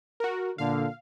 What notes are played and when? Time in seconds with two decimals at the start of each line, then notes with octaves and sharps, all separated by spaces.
0.20 F#4 A#4
0.58 A#2 D3 F5